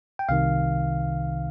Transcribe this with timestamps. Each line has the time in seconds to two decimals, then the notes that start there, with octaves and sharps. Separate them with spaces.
0.19 G5
0.29 C2 C3 D#3 F5